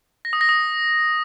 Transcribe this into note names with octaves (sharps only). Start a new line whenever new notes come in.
A#6
D#6
A#6
D#6